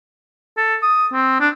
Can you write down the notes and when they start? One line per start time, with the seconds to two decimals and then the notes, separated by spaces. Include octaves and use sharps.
0.57 A4
0.82 D#6
1.13 C4
1.40 D4